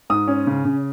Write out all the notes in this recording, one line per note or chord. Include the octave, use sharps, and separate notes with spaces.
G#2 D#6
C#4
C#3
C#3